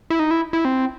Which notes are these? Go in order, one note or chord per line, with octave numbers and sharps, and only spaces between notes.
E4
D#4
E4
E4
C4